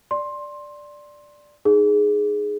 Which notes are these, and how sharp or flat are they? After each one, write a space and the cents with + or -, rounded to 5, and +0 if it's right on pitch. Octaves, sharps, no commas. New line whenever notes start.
D5 +0 C6 +15
D#4 -15 G#4 +5